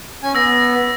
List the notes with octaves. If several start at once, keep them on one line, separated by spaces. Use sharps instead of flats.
C#4 G#5
B3 E6 A#6